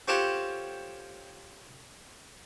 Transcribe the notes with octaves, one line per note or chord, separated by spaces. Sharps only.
C4 C#4 F4 G4 A4 F#5